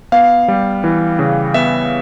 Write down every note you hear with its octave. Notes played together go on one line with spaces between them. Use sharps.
B3 F5
G3
E3
C#3
B3 E5